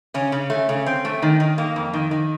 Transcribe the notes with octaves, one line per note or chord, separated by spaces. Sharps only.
C#3 C#4
C#3
A3
C#3
C4
A3
D#3
D#3
A#3
F2
D#3
D#3